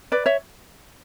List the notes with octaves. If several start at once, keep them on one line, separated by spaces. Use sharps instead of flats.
B4 D5
C#5 E5